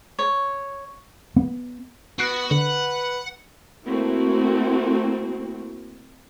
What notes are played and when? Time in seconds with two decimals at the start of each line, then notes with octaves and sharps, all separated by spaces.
0.19 C#5
1.36 B3
2.19 B3 F#4 F#6 C7 D7
2.51 D3 B4 F#5
3.84 A3 A#3 C4 E4 F#4